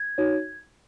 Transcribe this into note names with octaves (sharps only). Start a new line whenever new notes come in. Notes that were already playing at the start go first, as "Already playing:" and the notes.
Already playing: G#6
D#4 F#4 C#5